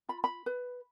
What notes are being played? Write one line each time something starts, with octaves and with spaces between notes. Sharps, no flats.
F4 B5
B5
B4